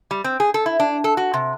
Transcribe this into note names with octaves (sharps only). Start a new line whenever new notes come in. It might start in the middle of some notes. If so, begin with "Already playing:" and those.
G3
C4
G#4
A4
E4
D4
A4
F#4
C3